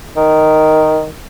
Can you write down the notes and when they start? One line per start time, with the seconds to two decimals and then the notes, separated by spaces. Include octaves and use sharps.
0.16 D#3